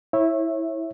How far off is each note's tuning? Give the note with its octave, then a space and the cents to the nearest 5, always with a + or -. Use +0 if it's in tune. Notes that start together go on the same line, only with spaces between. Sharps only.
E4 -15 C#5 -25 E5 +0